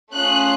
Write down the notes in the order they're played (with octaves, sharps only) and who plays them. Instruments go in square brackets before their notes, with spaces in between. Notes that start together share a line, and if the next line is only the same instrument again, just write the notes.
[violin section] A3 C#4 F4 G#4 F#6